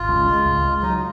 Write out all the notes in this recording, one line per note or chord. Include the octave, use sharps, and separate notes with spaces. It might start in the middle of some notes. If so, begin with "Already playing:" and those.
Already playing: G#1 F4
C#2
G#3
C#2
G#3
F#3 D#4